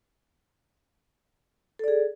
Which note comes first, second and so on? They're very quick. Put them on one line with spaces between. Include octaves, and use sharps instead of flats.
A4 D5 G#4